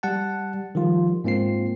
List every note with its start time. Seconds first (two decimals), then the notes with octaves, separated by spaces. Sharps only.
0.03 G3 F#5 A5
0.75 D#3 F3 G3 F4
1.24 G#2 A#3 C4 F4 C7